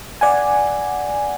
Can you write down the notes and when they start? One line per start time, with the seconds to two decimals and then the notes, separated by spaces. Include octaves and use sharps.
0.21 D5 F#5 G#5